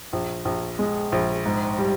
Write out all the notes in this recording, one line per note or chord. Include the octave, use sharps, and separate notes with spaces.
A#1
A#1
G#3
A#1
G#2
G3